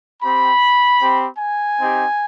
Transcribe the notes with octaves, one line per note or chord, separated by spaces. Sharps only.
C4 G4 B5
C4 G4
G#5
C4 D#4 G4